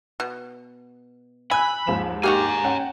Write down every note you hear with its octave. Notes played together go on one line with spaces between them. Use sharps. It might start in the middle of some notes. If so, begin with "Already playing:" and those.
B2
G#5 B5 E6 F#6
D#2 G#2 F3 E7
A#3 D#4 F#4 G4 G#5 A#5
C#4 F#5 G5 E7